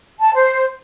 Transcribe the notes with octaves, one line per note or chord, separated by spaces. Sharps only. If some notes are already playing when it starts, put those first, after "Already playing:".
A5
C5